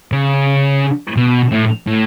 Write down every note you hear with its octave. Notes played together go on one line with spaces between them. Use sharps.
C#3
B2
A2
A2